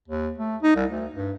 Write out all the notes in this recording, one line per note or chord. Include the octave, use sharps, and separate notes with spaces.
D#2
A3
D#4
C2
D2
G2